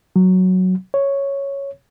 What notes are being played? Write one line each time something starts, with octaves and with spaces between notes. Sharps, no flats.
F#3
C#5